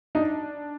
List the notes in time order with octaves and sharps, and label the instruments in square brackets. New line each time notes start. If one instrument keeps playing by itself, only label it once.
[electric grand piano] D4 [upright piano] D#4